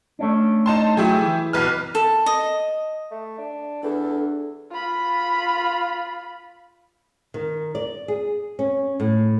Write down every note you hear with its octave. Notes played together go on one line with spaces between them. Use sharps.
A3 C#4 D4
D#4 A5 C6
F#3 A3 E4 G4 G#4
E3
B1 B4 F6
A4
D#5
A3
D4
E2 D4 A4
F4 B5
D#3
D5
G#4
C#4
A2